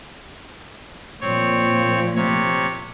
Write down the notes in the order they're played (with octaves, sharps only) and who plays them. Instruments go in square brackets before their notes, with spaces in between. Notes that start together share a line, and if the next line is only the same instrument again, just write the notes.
[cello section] A#2 F3 [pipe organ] C4 C#5
[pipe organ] C3 C#5